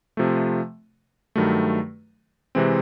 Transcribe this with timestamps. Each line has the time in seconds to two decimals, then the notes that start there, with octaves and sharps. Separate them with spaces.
0.17 C3 F3 A3
1.36 G2 D#3 F#3 A3
2.55 C3 E3 G#3 C4